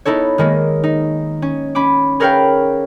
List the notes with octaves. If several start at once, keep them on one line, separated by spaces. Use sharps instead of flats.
B3 D#4 E4 A4 C#5
D#3 G#3 A#3
D#4
C#4
C#4 B5 D6
G#4 A#4 B4 C#5 F5 G5